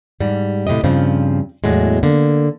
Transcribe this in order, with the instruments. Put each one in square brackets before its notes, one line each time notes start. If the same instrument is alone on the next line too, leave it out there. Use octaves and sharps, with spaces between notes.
[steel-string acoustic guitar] G#2 G3
A2 C3 G4 D#5
G2 C#3 F3 C4
E2 A2 F#3 G#3
D3 A#3